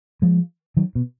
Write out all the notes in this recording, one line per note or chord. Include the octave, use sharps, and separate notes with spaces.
F3 G#3
D#3 F#3
B2